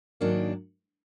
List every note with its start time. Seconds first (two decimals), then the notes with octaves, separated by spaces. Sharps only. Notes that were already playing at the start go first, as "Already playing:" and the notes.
0.21 G#2 D#3 F#3 A#3 D4